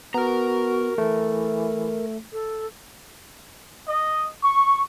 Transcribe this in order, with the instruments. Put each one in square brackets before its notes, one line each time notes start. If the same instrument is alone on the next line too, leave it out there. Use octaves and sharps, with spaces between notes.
[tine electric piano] B3 [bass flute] F#4 [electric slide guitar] A#4 A#5
[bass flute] E3 [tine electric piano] A3
[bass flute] A4
[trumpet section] D#5
C#6